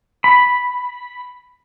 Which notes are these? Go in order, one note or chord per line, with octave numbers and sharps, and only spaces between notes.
B5